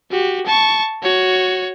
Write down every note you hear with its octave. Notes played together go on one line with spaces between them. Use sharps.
F#4 G4
A5 C#6
F#4 C#5